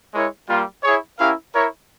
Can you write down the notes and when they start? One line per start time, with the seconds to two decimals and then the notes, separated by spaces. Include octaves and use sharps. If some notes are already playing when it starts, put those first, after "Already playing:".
0.13 G#3 E4 A#4 C#5
0.48 G3 A#3 F4
0.83 E4 G#4 C#5
1.19 C#4 E4 G4 A#4 F5
1.54 E4 A#4 C#5